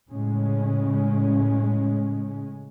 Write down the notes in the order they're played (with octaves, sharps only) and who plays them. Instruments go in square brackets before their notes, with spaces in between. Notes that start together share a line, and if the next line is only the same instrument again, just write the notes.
[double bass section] A2 C#3 G#3 C#4